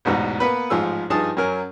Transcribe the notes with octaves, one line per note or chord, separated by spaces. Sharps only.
A1 E2 G#2 B2
A#3 B3 B4
A1 G#2 F3 G#4 E6
G2 F3 D#4 G#4 A5 D#6
F#2 F#3 A#4 G#5